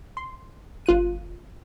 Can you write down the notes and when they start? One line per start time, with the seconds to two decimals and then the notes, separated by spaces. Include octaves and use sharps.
0.17 C6
0.86 G1 F4 F#6 D#7